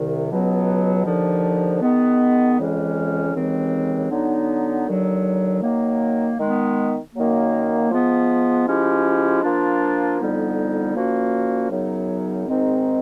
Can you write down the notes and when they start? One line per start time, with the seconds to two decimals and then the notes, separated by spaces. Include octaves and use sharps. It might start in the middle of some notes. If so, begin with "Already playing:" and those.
Already playing: C2 C3 D#3
0.30 C#2 B2 F#3 B3
1.06 D#2 D3 F3
1.82 D#3 G#3 B3
2.58 F2 C#3 E3 G#3 C#4
3.34 D#2 C#3 E3 G#3 C4
4.10 D3 F#3 B3 D#4
4.86 D#2 D3 F#3
5.63 D#3 F#3 A#3
6.39 D#3 G#3 B3
7.14 F#2 D#3 F#3 A#3
7.91 F3 G#3 B3
8.67 F3 G#3 C#4 E4 G4
9.43 F3 A#3 D4 F4
10.19 F2 D3 G3 B3 D#4
10.94 A#2 F3 A#3 C#4 F#4
11.71 F#2 C#3 F#3 B3 D#4
12.47 G#2 D#3 G#3 C4